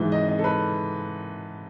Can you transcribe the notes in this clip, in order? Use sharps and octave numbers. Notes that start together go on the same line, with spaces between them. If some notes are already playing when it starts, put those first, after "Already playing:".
Already playing: G#2 E3
D#5
D#5
A4
B4